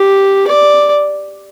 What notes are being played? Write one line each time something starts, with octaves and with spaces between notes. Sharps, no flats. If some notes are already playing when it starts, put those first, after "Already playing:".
Already playing: G4
D5